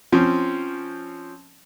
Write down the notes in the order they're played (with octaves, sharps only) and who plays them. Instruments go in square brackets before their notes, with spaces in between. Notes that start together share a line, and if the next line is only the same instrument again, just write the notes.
[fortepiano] F3 C4 C#4